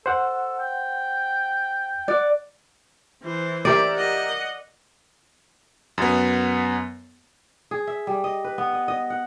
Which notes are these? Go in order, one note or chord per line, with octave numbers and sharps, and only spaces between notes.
A4 C5 F#5
G5
D5 F#5
E3 C5
G4 A#4 D5 E5
D#5 F#5
F#2 B3
G#4
E5
G3
D#5
B4
B3
D#5
D#5
F#5